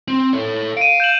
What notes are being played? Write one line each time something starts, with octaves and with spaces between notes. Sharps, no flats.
C4
A4 C#5
F5 D7 D#7
G6 E7 F#7